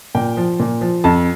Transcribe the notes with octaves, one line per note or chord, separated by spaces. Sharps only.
A#2 G5
F3
A#2
F3
F2 A5